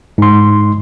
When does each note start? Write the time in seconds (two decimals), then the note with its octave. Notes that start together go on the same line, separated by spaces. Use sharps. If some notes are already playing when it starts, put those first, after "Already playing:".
0.18 G#2 C6